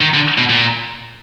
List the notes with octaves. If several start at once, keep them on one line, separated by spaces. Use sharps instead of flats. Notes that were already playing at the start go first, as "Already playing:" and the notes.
D#3
D3
B2
A#2